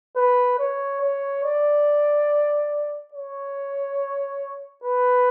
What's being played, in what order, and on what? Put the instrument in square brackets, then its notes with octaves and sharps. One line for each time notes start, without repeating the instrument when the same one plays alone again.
[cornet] B4
C#5
C#5
D5
C#5
B4